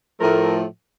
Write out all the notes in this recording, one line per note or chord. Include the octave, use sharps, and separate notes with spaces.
A2 F3 A3 A#4